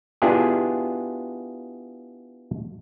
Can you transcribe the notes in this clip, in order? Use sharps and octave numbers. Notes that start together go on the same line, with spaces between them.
B3 D4 E4 F4 G4 G#4